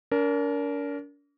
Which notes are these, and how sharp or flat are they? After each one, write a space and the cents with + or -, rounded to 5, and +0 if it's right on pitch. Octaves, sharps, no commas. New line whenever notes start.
D4 -45 A#4 +0